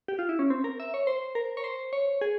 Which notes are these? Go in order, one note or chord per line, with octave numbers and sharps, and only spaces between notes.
G4
F4
E4
C#4
C4
A#4
E5
C#5
C5
A#4
C#5
C5
C#5
G#4